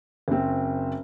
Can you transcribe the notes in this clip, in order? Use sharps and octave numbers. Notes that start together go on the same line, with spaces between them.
F#1 C4